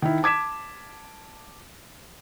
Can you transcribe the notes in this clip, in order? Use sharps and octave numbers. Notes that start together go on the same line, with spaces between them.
D#3 E4
A5 D6 G#6 B6 E7